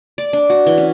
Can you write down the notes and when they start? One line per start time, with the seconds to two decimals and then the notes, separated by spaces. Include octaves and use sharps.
0.18 D5
0.33 D4
0.50 F#4
0.66 E3
0.78 C#4